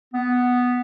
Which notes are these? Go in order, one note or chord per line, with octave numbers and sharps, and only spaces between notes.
B3